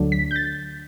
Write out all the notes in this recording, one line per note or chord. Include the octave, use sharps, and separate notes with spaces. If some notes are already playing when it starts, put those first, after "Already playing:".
Already playing: D2 D3 F#3 A3 D4
B6
G6
A6